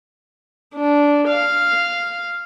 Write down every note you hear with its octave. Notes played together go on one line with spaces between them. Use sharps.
D4
F5